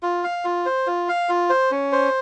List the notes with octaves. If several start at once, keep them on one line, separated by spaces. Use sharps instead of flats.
F4
F5
F4
C5
F4
F5
F4
C5
C#4
C5